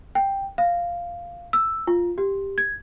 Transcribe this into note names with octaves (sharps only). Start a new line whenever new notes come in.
G5
F5
E6
F4
G4
G#6